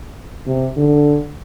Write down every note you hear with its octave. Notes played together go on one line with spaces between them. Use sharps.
C3
D3